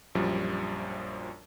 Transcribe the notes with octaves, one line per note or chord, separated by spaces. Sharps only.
A#1 F#2 F3 G3